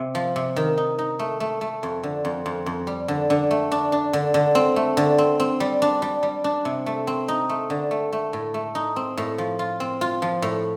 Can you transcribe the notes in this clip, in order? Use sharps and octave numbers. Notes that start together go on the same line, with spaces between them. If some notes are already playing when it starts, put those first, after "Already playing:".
Already playing: C3
F3
C3
D#3
D#4
D#4
A3
A3
A3
F2
D3
F2
F2
F2
G3
D3
D3
A3
D4
D4
D3
D3
C4
A3
D3
C4
C4
G3
D4
G3
G3
D4
C3
A3
C4
D#4
A3
D3
A3
A3
A2
A3
D#4
C4
A2
F3
F4
C4
F4
F3
A2